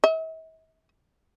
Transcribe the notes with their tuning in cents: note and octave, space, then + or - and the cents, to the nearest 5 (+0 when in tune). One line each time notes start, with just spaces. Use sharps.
E5 -45